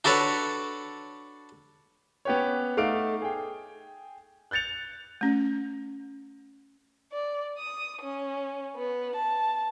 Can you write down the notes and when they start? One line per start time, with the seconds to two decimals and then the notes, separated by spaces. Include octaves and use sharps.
0.04 D4 F#4 A4 B4 C#5
2.25 B3 C#4 G4 B4 C#5
2.77 A3 D#4 F5 F#5 D6 D7
3.22 G#4 G5
4.51 F#6 G6 A6 C#7 F7
5.21 A3 C#4
7.12 D5
7.58 D#6
8.01 C#4
8.76 B3
9.15 A5